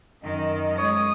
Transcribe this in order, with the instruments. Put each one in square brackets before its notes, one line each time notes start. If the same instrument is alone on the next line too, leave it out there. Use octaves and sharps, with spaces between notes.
[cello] F#2 D#3 [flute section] D#5
[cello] G#3 [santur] C#5 [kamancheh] D#6